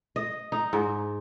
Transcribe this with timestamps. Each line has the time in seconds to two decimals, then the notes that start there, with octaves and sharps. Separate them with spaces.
0.16 D#5
0.52 D#4
0.73 G#2